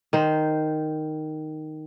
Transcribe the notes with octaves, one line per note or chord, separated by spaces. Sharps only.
D#3 C5